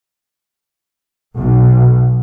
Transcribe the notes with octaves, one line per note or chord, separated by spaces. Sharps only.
B1